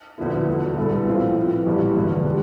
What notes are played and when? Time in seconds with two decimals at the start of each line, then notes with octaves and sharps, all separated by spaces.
0.18 D2 D3 F3 B3 E4
0.48 E1 D2 D3
0.76 C2 B2 B3 E4 A4
1.07 A2 F3 C4 F4
1.36 A2 F3 B3
1.66 A1 G2 E3 G3
1.96 E1 E2 D3 F3 B3
2.25 B2 G3 B3 D4